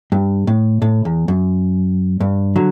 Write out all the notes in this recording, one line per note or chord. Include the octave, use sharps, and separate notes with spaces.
G2
A2
A2
E2
F#2
G2
D3 F#3